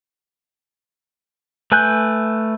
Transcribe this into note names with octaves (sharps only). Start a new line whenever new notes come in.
A3 B4 G#5 F#6 G6